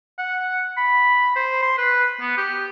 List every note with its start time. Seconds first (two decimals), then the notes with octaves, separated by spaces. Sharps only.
0.19 F#5
0.77 B5
1.36 C5
1.63 C6
1.78 B4
2.21 B3
2.38 G4